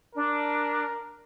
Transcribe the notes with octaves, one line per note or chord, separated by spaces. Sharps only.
D4 A#4